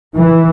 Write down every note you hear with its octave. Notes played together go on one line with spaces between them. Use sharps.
E3